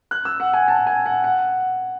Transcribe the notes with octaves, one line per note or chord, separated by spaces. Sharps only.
F#6
E6
F#5
G#5
A5
G#5
F#5
F#5